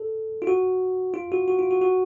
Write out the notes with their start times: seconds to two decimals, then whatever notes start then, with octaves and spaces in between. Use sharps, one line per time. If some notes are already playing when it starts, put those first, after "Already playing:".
Already playing: A4
0.42 F4
0.47 F#4
1.14 F4
1.32 F#4
1.48 F#4
1.59 F4
1.71 F#4
1.82 F#4